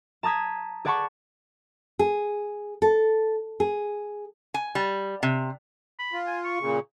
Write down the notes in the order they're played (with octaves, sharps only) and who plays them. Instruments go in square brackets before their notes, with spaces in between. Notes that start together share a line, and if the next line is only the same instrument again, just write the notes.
[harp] A5 A#5 D#6 G#6 B6
G#4 D5 F#5 A5 B5 C#6
[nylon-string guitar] G#4
A4
G#4
[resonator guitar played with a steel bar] G#5
G3
C3
[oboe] B5
[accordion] F4
[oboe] G#5
C#6
[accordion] A#2 C#3